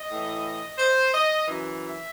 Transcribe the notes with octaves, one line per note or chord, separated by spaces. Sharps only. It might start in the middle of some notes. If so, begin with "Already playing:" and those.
Already playing: D#5
A2 E3
C5
D#5
F#2 E3
E5